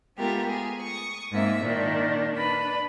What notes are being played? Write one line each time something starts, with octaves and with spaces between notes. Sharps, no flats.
G#3 A3 B3 F4 G4 A#4
G#4
C#6 D#6
G#2 A#3 C4 E5
A#2 D#3 D4
D4 B4 B5